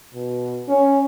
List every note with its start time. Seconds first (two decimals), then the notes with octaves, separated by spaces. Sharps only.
0.14 B2
0.68 C#4